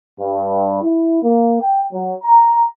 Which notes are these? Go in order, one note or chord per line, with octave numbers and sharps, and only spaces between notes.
G2
E4
A#3
G5
F#3
A#5